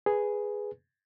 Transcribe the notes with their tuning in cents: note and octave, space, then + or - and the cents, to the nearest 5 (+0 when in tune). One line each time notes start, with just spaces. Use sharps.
G#4 +0 B4 +0